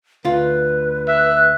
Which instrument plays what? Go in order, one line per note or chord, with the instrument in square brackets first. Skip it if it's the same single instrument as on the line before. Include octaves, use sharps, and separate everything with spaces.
[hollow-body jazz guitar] D2 F4 [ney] B4
[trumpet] E5 [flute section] F#6